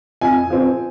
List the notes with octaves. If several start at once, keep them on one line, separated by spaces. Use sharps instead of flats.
F2 G#5
F3 C4